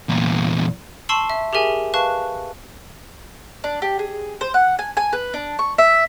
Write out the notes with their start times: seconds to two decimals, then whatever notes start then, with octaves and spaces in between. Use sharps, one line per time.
0.09 E2 A#2
1.09 A5 C6 C#6 E6 C7 F#7
1.30 E5
1.53 G4 G#4 A#4 E5 G#5
1.94 B4 F5 A5 C#6 F#6
3.64 D4
3.82 G4
3.99 G#4
4.41 C5
4.54 F#5
4.79 G#5
4.97 G#5
5.13 B4
5.34 D4
5.59 C#6
5.78 E5